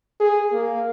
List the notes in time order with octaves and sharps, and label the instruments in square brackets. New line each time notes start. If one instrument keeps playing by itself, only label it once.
[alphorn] G#4
A#3